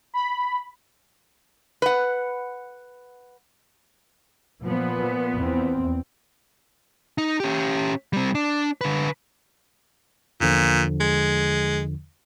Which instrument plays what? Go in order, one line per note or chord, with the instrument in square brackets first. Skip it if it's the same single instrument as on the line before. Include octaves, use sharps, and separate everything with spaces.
[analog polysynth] B5
[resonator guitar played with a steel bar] B4 F#5
[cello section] A#2 B3 [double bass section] F3
[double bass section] E2 C4
[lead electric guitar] D#4
C#4 G4
G3 C4
D4
D3 B4
[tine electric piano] E2 D3 F3 [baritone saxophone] A#2
[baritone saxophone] G#3